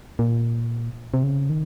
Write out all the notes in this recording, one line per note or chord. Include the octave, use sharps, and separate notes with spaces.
A#2
C3
C#3
D#3